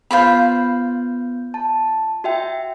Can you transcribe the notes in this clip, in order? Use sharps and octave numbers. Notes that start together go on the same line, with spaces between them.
B3 F4 C5 B5 G6
A5
F#4 E5 G5